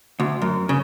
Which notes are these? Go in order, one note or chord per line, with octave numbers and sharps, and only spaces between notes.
D2
F#2
C#3